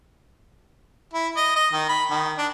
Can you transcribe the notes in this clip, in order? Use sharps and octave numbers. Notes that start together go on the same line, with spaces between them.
E4
D#5
D#5
D#3
B5
D#3
D4